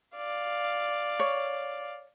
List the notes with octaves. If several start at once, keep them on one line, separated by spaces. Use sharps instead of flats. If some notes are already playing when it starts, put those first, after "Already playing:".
D5 F5
C#5